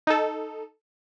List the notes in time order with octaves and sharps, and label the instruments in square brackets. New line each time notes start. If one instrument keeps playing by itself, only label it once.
[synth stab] D#4 A4